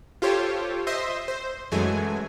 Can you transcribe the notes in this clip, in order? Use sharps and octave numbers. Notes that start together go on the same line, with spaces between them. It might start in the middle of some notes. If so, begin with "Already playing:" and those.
F4 G4 A4 C5 C#5
C5 D#5 E5 C6
C5
F#2 E3 F#3 G#3 A3 G#5